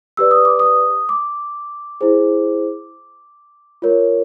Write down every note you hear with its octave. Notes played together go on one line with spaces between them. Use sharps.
G4 B4 D5 E6
D#6
D6
D#6
D6
E4 G#4 C5
F4 A#4 C#5